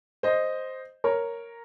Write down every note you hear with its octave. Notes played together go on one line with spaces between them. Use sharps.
C5 D#5
A#4 C#5